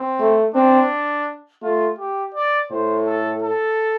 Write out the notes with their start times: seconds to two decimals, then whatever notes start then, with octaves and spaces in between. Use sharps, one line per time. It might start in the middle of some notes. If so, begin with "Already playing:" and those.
Already playing: C4
0.20 A3
0.55 C4 D4
1.62 A3 F4
1.99 G4
2.35 D5
2.71 A2 C5
3.06 A4
3.42 A4